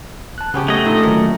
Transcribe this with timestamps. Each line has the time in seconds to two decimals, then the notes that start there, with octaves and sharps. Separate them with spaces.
0.38 A5 F#6
0.54 C#3 B3 C#4 G4
0.68 A3 D#5 G#6
0.85 A#2 D3 D#4
1.03 D#3 F#3 A#4 C#5